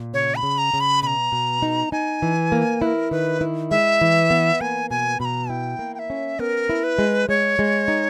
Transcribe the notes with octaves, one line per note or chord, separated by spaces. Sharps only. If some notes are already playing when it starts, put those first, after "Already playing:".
Already playing: A#2
C#3 C#5
B5
C#3
A#5
C#3
B5
B2 A#5 B5
B2
D#4
D#4 G#5
E3
A#3
E4 A#4 B4
D#3 B4
E4
G#3 E5
E3
B3
A#3 G#5
B2 G#5
B2 B5
A#5
E4 G5
A#3
G5
E5
C#4
B3 A#4
E4
B4
G#3
G#3 C#5
G#3
D#4